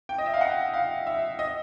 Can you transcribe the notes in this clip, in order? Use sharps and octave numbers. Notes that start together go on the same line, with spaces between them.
G5
D#5
E5
F5
F#5
F5
E5
D#5